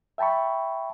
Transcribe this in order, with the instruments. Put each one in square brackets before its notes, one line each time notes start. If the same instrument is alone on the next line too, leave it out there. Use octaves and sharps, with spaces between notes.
[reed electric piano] E5 G5 A5 B5 C#6